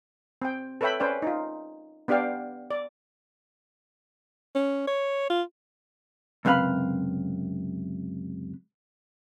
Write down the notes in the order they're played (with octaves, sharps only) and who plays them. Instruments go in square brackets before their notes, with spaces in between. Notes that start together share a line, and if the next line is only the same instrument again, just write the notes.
[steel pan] C4 G5
A4 B4 C#5 E5 G5 B5
C#4 B4 C5 D5 G5
D#4 F4
B3 D4 G4 D5 F5 G5
D5
[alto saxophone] C#4
C#5
F4
[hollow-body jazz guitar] C#2 F#2 C3 B4 F5 B5